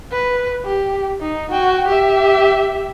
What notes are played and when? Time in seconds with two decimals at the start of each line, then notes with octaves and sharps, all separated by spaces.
0.12 B4
0.65 G4
1.21 D#4
1.52 F#4 G5
1.88 G4 E5